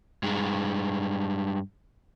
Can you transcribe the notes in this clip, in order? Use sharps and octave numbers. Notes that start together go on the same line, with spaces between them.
G2 G#3